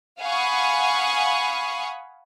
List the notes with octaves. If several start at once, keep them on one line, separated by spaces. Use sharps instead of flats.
F5 F#5 G#5 B5 C#6 D#6